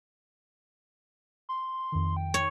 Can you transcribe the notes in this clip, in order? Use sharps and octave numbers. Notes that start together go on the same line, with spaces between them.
C6
F2 D#3
G5
C#5